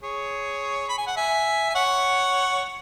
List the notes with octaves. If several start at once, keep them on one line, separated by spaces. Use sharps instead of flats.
G#4 C#5
B5
G#5
F#5
E5 G#5
G#5
C#5 F#5